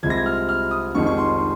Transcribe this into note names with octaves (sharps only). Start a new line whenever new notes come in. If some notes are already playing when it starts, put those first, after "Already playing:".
C2 C3 F3 G#3 G#6
A#6
G#6
F6
F6
D#6
F1 F2 D#3 G#3 C#6
C#6
C6